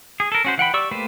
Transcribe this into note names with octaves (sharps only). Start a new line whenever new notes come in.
G#4
A4 A#4
C#4 F#4 C5
E3 F#5 G5 B5
G4 D5 C#6 E6
A3 A#3 G4 B4 C5